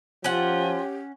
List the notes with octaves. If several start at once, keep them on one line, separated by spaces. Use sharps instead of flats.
F3 C#4 F4 G4 F#5